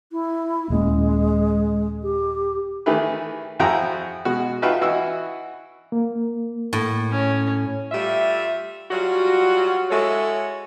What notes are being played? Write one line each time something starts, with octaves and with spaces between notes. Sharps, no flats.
E4
D#1 G#3 A#3 C#4
G4
D#3 E3 A3 G4 G#4 B4
F2 E4 F#4 G#4 G5 A#5
B2 G#3 F#4
D#4 F4 F#4 B4 E5 G5
E3 E4 F#4 D#5 E6
A#3
A2
C#4
G3 A3 F4 E5
F#3 G3 F4 F#4
G#3 E4 F#4 A4 C#5